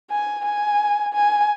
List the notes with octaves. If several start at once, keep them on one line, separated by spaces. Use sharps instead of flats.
G#5
G#5
G#5